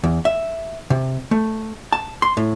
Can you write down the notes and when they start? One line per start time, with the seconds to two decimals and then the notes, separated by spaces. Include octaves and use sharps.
0.04 E2
0.25 E5
0.90 C3
1.31 A3
1.93 A5
2.22 C6
2.37 A2